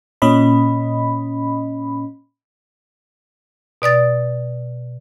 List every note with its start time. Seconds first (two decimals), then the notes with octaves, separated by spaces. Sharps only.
0.22 A#2 C#4 D#5 B5
3.82 B2 D5 D#6 A6